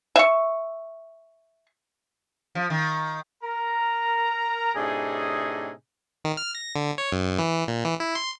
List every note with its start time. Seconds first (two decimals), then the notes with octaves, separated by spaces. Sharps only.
0.16 E5 C#6
2.55 F3
2.70 D#3
3.43 A#4 A#5
4.75 A2 C3 D4 D#4 G#4
6.25 D#3
6.37 F6
6.55 A#6
6.75 D3
6.98 C#5
7.12 F#2
7.38 E3
7.68 A#2
7.85 E3
8.00 E4
8.15 C6